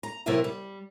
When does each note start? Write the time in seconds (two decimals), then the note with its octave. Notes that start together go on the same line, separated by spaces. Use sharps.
0.03 A#5
0.26 C3 F#3 A#3 E4 A#4 E5
0.44 G3